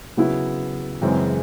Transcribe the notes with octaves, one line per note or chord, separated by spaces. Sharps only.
C#3 F#3 B3 E4
F#2 C#3 E3 G#3 C4